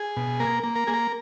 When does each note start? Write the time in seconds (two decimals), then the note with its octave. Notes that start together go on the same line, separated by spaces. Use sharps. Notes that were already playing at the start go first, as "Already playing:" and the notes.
Already playing: G#4
0.17 B2
0.40 A#3 A#4
0.63 A#3
0.76 A#4
0.87 A#3 G#4
0.94 A#4